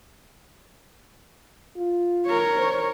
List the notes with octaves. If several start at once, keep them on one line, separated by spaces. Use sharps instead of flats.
F4
A#4 C#5
C5